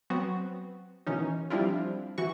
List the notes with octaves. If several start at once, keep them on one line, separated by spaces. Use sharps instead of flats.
F#3 B3 C4 F#4
B2 D#3 E3 C#4 D#4
F3 G3 C4 D4 E4 F4
E3 F#4 C#6